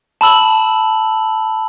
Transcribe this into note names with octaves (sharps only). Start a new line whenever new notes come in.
A5 B5 E6 F#7